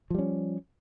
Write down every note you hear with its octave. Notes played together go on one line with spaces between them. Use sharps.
F3 G3 C#4